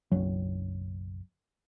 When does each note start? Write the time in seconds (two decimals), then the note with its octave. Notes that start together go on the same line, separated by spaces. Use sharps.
0.12 F#1 B1 F#3